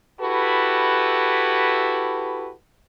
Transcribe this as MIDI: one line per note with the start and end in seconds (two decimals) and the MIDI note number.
0.21 2.51 64
0.21 2.51 66
0.21 2.51 67
0.21 2.51 69
0.21 2.51 71